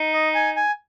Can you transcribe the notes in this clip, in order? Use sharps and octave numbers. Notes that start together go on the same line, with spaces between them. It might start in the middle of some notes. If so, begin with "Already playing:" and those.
Already playing: D#4
D#5
G#5
G#5